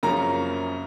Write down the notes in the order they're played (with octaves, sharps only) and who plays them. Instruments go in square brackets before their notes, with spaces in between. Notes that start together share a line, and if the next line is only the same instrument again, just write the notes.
[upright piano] F#2 C#3 F3 A#3 C#4 [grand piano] A#5